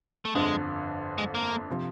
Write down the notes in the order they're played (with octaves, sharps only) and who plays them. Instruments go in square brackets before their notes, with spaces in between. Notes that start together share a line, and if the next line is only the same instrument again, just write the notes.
[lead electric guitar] A3
[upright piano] G1 F2 D3 [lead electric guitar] G#3
[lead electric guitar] G#3
A#3
[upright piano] C3 F3